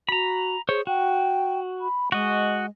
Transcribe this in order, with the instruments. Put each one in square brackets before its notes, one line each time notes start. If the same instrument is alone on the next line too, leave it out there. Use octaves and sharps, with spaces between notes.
[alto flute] F#4 [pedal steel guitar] A#5 B5
[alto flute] G#4 [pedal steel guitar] C5 C#5
[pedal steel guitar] F#4 [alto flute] G5
[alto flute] B5
[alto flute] G#3 [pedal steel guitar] F#4 D#5